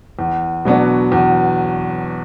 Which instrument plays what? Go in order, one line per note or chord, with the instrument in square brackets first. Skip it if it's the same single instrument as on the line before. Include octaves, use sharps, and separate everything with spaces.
[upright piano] E2
B2 F#3 B3 D4
E2